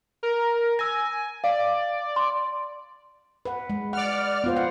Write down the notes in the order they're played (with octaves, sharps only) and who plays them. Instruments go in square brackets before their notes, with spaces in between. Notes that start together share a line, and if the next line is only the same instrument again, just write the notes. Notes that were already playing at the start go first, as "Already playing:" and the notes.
[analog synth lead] A#4
[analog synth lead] G#5 [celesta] E6 A#6
[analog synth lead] D5 [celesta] F5
[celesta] C6
[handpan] B4 F#5
G#3
[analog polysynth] D5 F6 [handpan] F#5
[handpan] B3 F4 C5
F#5